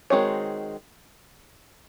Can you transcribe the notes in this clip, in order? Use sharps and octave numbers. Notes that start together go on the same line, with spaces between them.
D#3 G#3 C4 F#4 C#5